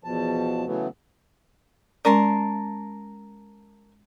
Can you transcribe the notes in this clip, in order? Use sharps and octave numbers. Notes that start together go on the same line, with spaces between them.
E2 B2 F3 A5
C#3 E3 F#3 A3 B3
G#3 C#4 A#4 D5 A5 C6